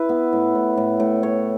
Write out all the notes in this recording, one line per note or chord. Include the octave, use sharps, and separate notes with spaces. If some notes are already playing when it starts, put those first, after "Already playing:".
Already playing: E4 B4
B3
A2
A2
A2
A2
C#5